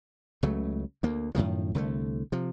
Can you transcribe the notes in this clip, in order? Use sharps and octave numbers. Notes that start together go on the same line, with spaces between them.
C#2 C#3 F#3 A3
D2 A#3
F#2 A2 D#3 F3
C2 D3 F#3 A3
C3 F3